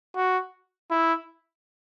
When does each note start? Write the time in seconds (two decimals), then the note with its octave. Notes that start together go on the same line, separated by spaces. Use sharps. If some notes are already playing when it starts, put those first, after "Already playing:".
0.16 F#4
0.91 E4